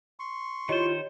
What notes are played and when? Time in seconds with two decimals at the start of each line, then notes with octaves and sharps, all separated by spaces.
0.19 C6 C#6
0.69 D#3 E4 F4 G4 C5 C#5 D#5